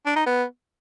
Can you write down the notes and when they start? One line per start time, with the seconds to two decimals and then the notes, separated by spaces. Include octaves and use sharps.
0.06 D4
0.16 D#4
0.26 B3